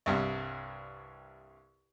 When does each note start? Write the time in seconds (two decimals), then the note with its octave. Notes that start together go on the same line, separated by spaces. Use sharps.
0.06 C2 G2 C3